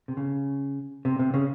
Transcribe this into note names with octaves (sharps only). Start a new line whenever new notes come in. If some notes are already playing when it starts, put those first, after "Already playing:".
C3
C#3
C3
C3
C#3